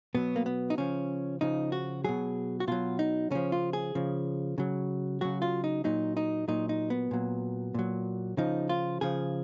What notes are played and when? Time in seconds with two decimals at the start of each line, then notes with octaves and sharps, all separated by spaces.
0.15 B2 F#3 B3
0.36 A#3
0.46 B3
0.70 D#4
0.78 C#3 F3 C#4
1.41 C#3 F3 D#4
1.72 F#4
2.04 B2 F#3 G#4
2.60 F#4
2.67 B2 F#3 F4
2.99 D#4
3.31 C#3 F3 C#4
3.52 F4
3.73 G#4
3.95 C#3 F3
4.58 C#3 F#3
5.21 C#3 F#3 F#4
5.42 F4
5.64 D#4
5.84 A#2 F#3 D#4
6.17 D#4
6.48 A#2 F#3 D#4
6.69 D#4
6.90 B3
7.11 A#2 F#3
7.75 A#2 F#3
8.37 C#3 F3 D#4
8.69 F4
9.01 C#3 F3 G#4